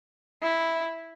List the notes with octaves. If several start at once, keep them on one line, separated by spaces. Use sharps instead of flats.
E4